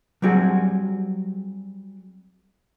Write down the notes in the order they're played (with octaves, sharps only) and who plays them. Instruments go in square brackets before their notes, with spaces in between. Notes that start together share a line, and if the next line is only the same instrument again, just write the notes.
[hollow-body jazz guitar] F#3 G3 C4 F#4 G#4